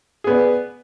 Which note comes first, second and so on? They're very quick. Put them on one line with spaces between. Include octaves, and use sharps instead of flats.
G#4 B3 D5